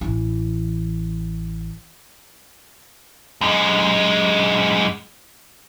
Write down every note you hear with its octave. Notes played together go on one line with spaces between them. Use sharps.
A1 E3
F#2 G#3